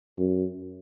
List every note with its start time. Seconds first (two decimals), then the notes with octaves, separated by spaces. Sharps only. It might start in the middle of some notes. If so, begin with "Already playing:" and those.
0.18 F#2